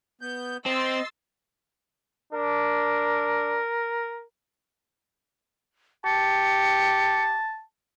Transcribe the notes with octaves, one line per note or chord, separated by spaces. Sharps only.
B3 G6
C4 D#5 C6 E6 A6
D4 A#4
G4 A5 C#7